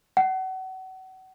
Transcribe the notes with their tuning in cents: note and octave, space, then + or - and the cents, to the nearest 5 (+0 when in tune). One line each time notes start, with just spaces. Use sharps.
F#5 +30